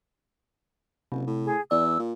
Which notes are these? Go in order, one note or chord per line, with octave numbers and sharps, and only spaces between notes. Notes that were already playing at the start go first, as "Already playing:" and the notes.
F#1 C3
A2
G#4
E2 D5 E6
A#2